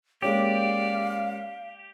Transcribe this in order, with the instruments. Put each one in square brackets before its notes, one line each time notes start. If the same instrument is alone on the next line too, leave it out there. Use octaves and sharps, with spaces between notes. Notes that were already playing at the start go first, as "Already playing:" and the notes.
[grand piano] G#3 A#3 C#4 [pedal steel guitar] G4 [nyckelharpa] D5 [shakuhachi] F5